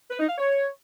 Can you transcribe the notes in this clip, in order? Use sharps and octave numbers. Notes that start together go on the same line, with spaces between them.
B4
D#4
F5
C#5